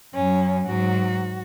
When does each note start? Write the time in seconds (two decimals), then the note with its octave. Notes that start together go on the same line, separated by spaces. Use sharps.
0.14 F#2 F#3 C#4
0.66 G#2 F#3 F#4